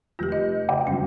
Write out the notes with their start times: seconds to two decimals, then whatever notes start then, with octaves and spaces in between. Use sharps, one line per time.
0.19 F1 F4 G4 G6 A#6
0.32 D#5
0.69 C#3 G5
0.87 G1 F#2 C#4